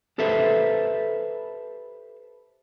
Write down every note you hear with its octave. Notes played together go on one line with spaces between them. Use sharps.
G4 A4 B4 C5 E5